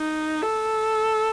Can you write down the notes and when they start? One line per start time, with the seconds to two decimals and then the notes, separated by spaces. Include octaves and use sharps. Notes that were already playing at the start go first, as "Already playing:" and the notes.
Already playing: D#4
0.42 A4